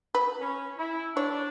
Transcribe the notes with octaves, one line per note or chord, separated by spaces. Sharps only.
B4
C#4
E4
D4 C#5